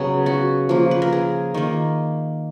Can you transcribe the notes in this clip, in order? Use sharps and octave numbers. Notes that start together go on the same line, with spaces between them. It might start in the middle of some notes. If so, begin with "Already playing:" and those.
Already playing: C#3 F#3 B3
F#4
F3 A#3
B4
A#4
G#4
D#3 A#3